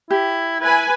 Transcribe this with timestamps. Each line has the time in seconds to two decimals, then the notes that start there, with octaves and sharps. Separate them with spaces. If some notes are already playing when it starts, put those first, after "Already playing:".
0.11 E4 G4
0.61 E4 B4 G#5